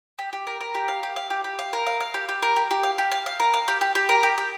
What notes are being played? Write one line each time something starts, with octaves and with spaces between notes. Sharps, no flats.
G4
G4
A#4
A#4
G4
F5
G4
F5
G4
G4
F5
A#4
F5
F5
G4
G4
A#4
G4
G4
F5
G4
F5
F5
A#4
F5
G4
G4
G4
A#4
G4
G4